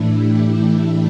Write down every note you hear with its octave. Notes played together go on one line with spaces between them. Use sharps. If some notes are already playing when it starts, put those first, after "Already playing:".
Already playing: A2 E3 A3 D4 E4
G4